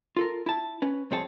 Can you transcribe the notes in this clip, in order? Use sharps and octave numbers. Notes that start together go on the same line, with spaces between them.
F4 A4 A#4
E4 A5
C#4 B4
C2 F2 C4 G#4 C#5 A5